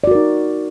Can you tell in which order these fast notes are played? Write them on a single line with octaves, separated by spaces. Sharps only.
D5 F#4 A#4 D#4